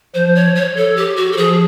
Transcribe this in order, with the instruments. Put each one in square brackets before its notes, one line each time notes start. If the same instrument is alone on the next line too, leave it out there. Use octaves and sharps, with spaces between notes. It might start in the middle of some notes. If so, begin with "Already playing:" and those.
[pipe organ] F3 [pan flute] C5
[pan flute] C#5
C#5
A4
G4
F#4
A4
[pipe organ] F3 [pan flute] G#4